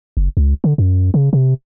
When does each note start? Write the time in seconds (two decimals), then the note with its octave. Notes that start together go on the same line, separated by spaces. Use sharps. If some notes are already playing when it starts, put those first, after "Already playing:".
0.17 F#1
0.37 C#2
0.64 D3
0.78 F#2
1.14 C#3
1.33 C3